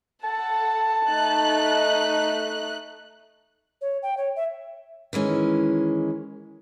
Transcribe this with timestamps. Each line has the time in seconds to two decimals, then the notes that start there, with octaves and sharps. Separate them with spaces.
0.24 A4 F#5 A5
1.10 A3 D#4 F#6
3.81 C#5
4.03 G5
4.17 C#5
4.36 E5
5.13 D#3 E3 G#3 C#4